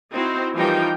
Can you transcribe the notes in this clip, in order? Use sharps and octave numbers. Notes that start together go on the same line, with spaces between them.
C4 D#4 E4 F#4 C5
E3 F3 G3 D#4 A#4 G5